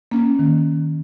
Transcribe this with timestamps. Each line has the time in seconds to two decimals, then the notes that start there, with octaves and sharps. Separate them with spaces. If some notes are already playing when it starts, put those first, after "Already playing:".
0.11 A#3 C#4
0.39 D#3